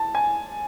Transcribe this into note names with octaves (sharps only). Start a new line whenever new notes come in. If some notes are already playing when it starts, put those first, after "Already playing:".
Already playing: A5
G#5